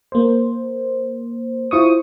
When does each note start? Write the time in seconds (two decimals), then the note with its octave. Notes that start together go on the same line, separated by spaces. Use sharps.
0.12 A#3 C5
1.71 E4 F4 C5 C#6 D#6